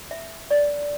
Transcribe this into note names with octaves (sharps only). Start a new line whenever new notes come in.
E5
D5